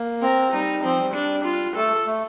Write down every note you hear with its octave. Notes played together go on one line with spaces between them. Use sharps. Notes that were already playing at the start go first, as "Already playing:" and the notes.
Already playing: A#3
C4 A#4
G3 D#4
F3 C4
G3
D4
F4
A3 A4
A3